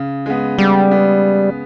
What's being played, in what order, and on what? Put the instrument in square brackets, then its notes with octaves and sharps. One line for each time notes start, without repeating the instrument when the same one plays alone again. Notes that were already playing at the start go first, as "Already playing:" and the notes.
Already playing: [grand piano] C#3
G#3 B3
[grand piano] C#3 [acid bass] G3
[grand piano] G#3 B3